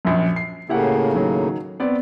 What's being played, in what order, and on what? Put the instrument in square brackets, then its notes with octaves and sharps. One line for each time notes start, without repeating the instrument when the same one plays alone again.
[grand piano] A#1 F#2
C7
[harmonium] A2 C#3 A#3 [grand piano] E4 G4 F#5
[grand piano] D#3 F#3
B3 C4 D5